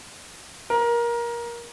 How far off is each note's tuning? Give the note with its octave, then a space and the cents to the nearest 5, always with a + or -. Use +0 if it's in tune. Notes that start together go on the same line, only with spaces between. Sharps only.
A#4 +20